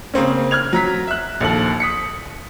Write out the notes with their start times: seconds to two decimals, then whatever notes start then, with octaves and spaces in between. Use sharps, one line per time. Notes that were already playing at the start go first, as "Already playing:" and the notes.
0.14 C#3 A#3 C4 C#4
0.51 F6 F#6 G#6 F7
0.73 F#3 A#5 B6
1.07 E5 F#6
1.41 A#1 D#2 A4 F#7
1.80 D#6 B6 C#7